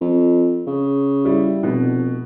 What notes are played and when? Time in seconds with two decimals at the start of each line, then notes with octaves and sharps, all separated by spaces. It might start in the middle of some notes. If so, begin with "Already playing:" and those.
0.01 F2
0.67 C#3
1.25 G3 E4
1.63 F1 B2